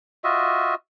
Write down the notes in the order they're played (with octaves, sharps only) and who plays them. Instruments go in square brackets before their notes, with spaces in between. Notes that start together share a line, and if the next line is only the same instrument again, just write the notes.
[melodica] F4 F#4 D#5 E5